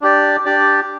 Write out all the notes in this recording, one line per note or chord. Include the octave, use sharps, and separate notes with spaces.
D4 G4 D5
D4 G4 D5